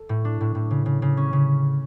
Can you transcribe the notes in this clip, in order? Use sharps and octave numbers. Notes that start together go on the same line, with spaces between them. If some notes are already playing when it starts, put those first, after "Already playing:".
Already playing: A4
A2
D4
A2
A2
C#3
C#3
C#3
C#4
C#3